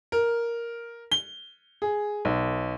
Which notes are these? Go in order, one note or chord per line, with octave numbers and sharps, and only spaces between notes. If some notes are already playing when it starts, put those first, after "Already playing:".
A#4
G7
G#4
B1